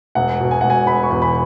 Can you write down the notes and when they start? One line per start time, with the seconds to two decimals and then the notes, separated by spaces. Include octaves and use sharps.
0.15 E1 F#5
0.40 B2
0.51 G#5
0.61 E1 F#5
0.70 G#5
0.86 E1 B5
1.03 C#6
1.10 E2
1.22 B5